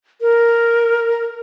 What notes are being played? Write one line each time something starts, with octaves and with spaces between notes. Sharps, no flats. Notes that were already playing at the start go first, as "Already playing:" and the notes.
A#4